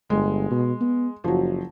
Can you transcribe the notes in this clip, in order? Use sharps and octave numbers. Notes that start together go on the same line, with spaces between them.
G1 G#3
B2
B3
F#1 F3 F#3